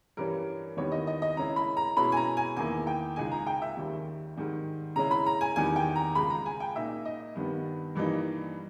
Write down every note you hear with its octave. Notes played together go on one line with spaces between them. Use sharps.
G2 E3 G3 C#4 A#4
D#2 D#3 G3 B3 E4 C#5
D#5
D#5
D#5
C#3 G#3 C#4 E4 A#5
B5
A#5
B2 G#3 C#4 E4 B5
G#5
A#5
G#5
E2 D#3 A#3 E4 G#5
G5
C#2 C#3 G#3 D#4 G#5
A#5
G5
E5
D#2 D#3 G3
G#2 D#3 G3
C#3 G#3 C#4 E4 A#5
B5
A#5
G#5
E2 D#3 G3 G#5
G5
A#5
C#2 C#3 G#3 B5
A#5
G#5
G5
A#2 A#3 D#4 E5
D#5
G2 D#3 G3 B3
G2 E3 G3 A#3 D#4